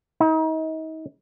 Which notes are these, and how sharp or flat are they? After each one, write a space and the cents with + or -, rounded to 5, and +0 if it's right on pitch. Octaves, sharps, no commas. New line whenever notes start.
D#4 +35